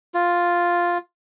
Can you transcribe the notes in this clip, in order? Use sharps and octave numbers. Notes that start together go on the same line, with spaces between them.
F4